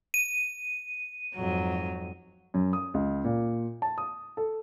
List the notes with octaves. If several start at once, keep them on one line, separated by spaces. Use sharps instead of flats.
D#7
F2 G#2 F#3
F#2
D#6
C#2
A#2
A5
D#6
A4